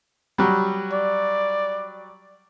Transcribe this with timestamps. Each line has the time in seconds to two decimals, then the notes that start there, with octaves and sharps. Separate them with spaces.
0.38 F#3 G3
0.93 D5